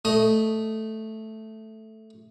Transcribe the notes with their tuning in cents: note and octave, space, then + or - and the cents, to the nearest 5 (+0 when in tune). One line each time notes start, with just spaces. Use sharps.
A3 +0 D#5 +0 D#6 +25